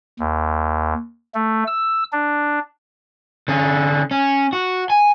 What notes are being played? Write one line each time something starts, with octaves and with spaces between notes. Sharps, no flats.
D#2
A3
E6
D4
D3 C#4
C#4
F#4
G#5